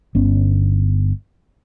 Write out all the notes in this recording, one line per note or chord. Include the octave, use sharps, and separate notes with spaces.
G1 B3 C#4